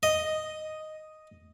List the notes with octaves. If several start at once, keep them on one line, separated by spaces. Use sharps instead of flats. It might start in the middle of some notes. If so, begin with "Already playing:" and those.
D#5